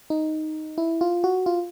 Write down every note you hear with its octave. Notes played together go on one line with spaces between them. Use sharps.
D#4
E4
F4
F#4
F4